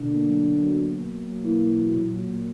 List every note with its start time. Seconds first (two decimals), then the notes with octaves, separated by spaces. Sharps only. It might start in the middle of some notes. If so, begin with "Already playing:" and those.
Already playing: B2 D3
0.09 A#3
0.26 F#3
0.44 B2
0.60 F#3
0.77 B2
0.93 B2
1.11 A#3
1.27 F#3
1.43 E3 A#3
1.60 A#3
1.78 F#3
1.94 A#2
2.11 F#3
2.28 A#2